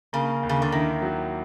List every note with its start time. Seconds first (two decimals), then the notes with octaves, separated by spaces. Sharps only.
0.13 C#3 A#3
0.43 D#2
0.49 C#3
0.62 D3
0.72 D#3 E4
1.02 F#3